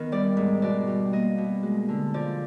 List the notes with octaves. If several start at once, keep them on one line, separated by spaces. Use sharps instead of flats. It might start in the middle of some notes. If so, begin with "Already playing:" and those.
Already playing: D#3 B3 A#4
G3 D5
G#2
B2 D5
G3
A#3 D#5
B2
G#3
D3
F3 D5